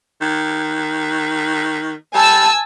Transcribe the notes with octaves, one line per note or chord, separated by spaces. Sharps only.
D#3
G3 G#5 A5 E6